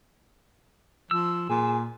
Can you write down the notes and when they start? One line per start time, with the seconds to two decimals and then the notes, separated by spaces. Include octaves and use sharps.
1.11 F3 E6
1.49 A#2 G#4